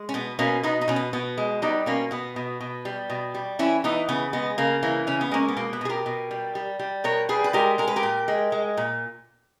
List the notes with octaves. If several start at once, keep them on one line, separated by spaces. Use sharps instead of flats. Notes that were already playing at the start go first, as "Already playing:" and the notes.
Already playing: G#3
C#4
B2 B3
B2 A#3 C#4
B2 B3 D#4
D#4
B2 C#4
B3
B2 B3
G#3
G3 B3 D#4
B2 A#3 C#4
B2 B3
B2
B2
G3
B2
G3
E3 C#4 E4
E3 B3 D#4
C#3 B3
G#3 B3
C#3 A#3
E3 A#3 C#4
C#3 C#4
B3
G#3 A#3 C#4
B3
B2 A#3
B3
B2 G#4
G4 A#4
B2
G3
G3
G3
B2 A#4 C#5
G3 G#4 B4
B4
G#3 G4 A#4
G#3 A#4
B4
G4 A#4
A#2
G#3
G#3
A#2